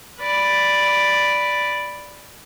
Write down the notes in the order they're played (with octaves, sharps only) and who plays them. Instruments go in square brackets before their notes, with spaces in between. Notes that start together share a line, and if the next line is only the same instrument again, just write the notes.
[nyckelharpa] B4 D5